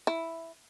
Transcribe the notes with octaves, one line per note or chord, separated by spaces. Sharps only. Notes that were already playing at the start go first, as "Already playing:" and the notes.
E4